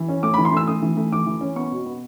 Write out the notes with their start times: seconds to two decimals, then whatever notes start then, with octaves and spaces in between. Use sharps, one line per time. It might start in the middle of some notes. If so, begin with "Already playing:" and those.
Already playing: E3
0.09 C#4
0.23 A3 D6
0.34 E3 B5
0.45 C6
0.53 A3 E6
0.67 A3 D#6
0.82 E3
0.97 A3
1.12 E3 D6
1.27 E3
1.41 C#4
1.56 B3 C#6
1.72 B2
1.86 B3